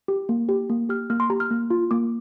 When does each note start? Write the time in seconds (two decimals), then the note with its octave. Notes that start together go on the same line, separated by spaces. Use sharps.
0.08 G4
0.29 A#3
0.49 G4
0.70 A#3
0.89 G4 F6
1.10 A#3 F6
1.20 C6
1.30 G4 A#5
1.40 F6
1.50 A#3
1.70 F4
1.91 A#3 D6